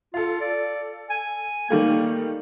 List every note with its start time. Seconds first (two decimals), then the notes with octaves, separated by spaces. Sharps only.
0.14 F4 A4 F5
0.41 D5
1.10 G#5
1.70 D#3 G3 A3 A#3